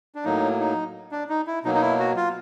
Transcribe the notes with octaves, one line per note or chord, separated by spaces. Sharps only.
D4
A2 F#3 A#3 D#4
D#4
D4
D#4
E4
B2 F#3 A#3 D#4
D#4
E4
F#4
F4